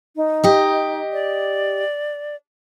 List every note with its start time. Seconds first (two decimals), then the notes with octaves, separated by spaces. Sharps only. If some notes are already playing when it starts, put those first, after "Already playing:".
0.16 D#4
0.44 G4 D#5
1.13 D5